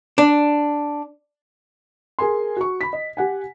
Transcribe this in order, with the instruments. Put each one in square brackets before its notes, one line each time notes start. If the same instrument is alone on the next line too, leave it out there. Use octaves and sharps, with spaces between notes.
[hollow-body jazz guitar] D4
[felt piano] G#4 A#4 G#5 C6
F#4 C#6
B5 B6
D#5
G4 F#5 G#5